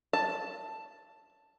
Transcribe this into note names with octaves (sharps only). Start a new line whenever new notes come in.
A5